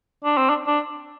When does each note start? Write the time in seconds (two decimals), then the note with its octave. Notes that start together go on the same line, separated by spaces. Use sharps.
0.24 D4
0.37 C4
0.49 D4
0.67 D4